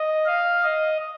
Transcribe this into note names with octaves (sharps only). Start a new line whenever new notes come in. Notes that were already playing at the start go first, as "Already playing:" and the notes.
Already playing: D#5
F5
D#5